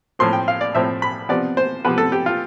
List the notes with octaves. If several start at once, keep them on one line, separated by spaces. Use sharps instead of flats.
A2 F3 C4 C6
G5
F5
D5
A2 F3 C4 E5
B5
C3 F3 B3 D5
C5
C3 F3 B3 B4
A4
G4
F4